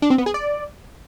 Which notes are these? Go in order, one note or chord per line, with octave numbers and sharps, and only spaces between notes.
D4
C4
B3
G#4
D5